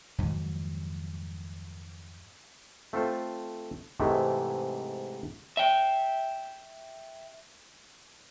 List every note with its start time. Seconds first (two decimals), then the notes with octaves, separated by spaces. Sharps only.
0.18 F2 G#2 D#3 F#3
2.93 A3 C4 F4 A4 C5
4.00 G#2 C3 E3 G#3 A3
5.57 E5 G5